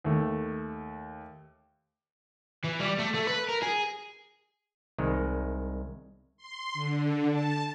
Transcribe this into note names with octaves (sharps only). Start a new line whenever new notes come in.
D#2 A3
E3
G3
A3
A3
B4
A#4
G#4
C2 D#3 G#3
C6
D3
A5